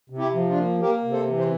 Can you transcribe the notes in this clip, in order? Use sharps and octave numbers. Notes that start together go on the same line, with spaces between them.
C3
E4 G4
F3
D4 F4
A#3
A#3 G4 A#4
C3
A4 C5
E3
C5